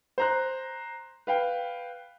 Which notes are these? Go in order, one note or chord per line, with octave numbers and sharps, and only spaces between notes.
C5 A#5 F#6
B4 F5 G5